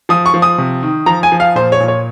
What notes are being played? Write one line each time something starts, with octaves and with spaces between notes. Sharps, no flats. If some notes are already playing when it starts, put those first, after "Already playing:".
F3 D#6
C#6
F3
D#6
C3
D#3
F3 A#5
G#5
F3
F5
A#2 C5
C#5
A#2
C#5